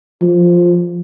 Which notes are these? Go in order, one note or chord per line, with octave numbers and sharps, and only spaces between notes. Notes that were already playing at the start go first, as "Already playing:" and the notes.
F3